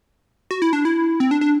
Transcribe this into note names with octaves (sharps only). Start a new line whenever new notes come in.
F#4
E4
D4
E4
C4
D4
D4